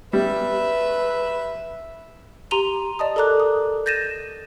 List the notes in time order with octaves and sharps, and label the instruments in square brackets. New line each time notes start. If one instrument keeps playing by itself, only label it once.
[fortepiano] G3 [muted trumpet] B4 [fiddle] E5
[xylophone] G4 A#5 C6 D#7 F7 G7
D5 D#5 A5 D#6
A4 A#4 D5 A#5 D6 F#6
D#6
G6 A6 A#6 D#7 E7